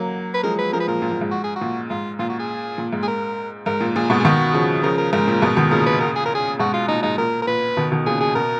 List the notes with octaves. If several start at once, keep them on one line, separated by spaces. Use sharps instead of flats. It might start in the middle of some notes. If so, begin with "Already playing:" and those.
Already playing: F#3 A#3
B4
F3 G#3 A#4
B4
F3 G#3 A#4
B4
A#2 A#4
A#2
A#2
G#2
F#4
G#4
F#4
A#2
G#2 F4
A#2 F4
F#4
G#4
A#2
G#2
G#4
A#4
G#2 A#4
A#2
A#2 G#4
G#2 B2 F#4
G#4
B2 D#3 F#4
C#3 F3
C#3 F3 A#4
A#4
G#2 A#4
A#2
G#2 B2
B2 D#3
A#2 C#3 A#4
B4
A#4
G#4
A#4
G#4
G#2 B2 F#4
F4
A#2 D#4
G#2 D#4
A#2 A#4
A#4
A#2 B4
B2 D#3
B2 D#3
A#2 C#3 G#4
G#4
B2 A#4